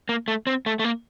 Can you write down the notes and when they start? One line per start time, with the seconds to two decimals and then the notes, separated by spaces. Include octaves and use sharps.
0.09 A#3
0.28 A3
0.47 C4
0.66 A3
0.79 A3
0.84 A#3